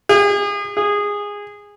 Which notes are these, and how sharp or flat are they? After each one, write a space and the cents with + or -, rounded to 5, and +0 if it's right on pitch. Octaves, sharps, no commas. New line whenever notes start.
G#4 -35
G#4 -15